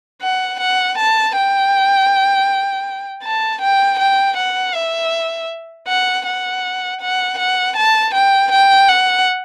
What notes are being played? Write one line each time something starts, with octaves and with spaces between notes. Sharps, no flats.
F#5
F#5
A5
G5
A5
G5
G5
F#5
E5
F#5
F#5
F#5
F#5
A5
G5
G5
F#5